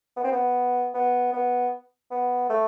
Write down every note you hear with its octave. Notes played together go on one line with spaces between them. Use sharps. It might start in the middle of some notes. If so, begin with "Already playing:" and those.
B3
C4
B3
B3
B3
B3
A3